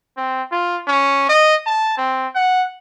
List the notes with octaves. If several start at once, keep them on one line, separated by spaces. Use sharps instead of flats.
C4
F4
C#4
D#5
A5
C4
F#5